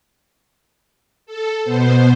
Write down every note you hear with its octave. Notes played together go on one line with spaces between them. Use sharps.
A4
B2 B3 C5